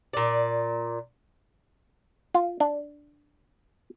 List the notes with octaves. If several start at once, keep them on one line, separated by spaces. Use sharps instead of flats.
A#2 D5
F4
D4